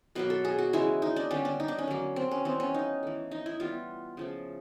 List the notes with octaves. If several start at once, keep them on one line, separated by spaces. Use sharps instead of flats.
B2 F#3 A#3 B4
A4
G#4
F#4
C#3 E3 G#3 E4
D#4
D4
D3 G3 B3 C#4
D4
D#4
D4
C#4
D3 F#3 A#3
C4
C#4
E3 G3 B3 C4
C#4
D#4
E3 A3
D#4
E4
E3 G3 B3 F4
C#3 F3 A3